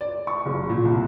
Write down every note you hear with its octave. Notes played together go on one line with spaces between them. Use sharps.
D5
C#6
F#1
A#2
C2